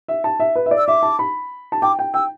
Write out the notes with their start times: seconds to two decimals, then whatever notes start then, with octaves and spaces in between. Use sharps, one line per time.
0.08 E5
0.24 A5
0.40 E5
0.56 B4
0.66 E5
0.71 D5
0.78 E6
0.87 E5 D6
1.03 A5
1.19 B5
1.72 A5
1.82 G5 D6
1.99 G5
2.14 G5 E6